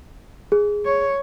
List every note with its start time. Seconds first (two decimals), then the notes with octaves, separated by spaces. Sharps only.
0.52 G#4
0.85 C#5